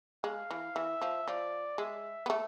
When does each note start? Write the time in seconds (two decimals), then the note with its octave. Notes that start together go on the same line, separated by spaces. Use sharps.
0.24 G#3 F5
0.51 E3
0.75 E3 E5
1.02 F3
1.28 F3 D5
1.78 G#3 E5
2.26 B3
2.30 A3